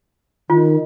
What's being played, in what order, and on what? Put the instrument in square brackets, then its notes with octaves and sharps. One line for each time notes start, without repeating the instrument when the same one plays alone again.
[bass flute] D#3 [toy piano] F4